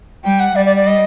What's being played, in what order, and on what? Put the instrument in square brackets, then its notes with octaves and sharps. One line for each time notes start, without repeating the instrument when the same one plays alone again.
[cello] G3 [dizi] G5
[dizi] F#5
[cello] G3 [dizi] D5
[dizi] D5
D5
D#5